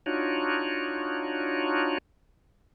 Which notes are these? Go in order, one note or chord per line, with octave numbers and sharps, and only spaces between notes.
D4 D#4 F4 F#4 C#5